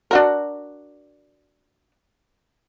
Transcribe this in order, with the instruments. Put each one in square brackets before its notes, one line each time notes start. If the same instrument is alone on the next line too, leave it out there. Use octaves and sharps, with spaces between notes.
[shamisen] D4 F#4 A#4